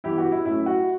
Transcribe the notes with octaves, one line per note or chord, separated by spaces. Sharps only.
G2 E3 B3 E4 G4
F#4
E4
A2 F#3 A3 C#4 E4
F#4